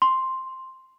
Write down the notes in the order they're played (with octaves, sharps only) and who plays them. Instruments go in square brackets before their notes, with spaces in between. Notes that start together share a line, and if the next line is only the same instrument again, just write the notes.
[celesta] C6